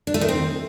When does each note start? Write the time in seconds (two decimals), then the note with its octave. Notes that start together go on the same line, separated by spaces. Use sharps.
0.07 D4
0.14 A3
0.21 D#3
0.28 C4